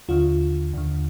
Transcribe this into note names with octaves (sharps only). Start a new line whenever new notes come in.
D#2 D3 F4
D#2 D3